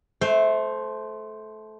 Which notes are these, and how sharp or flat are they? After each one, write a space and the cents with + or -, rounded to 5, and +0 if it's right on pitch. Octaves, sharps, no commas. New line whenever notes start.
A3 -20 C5 +0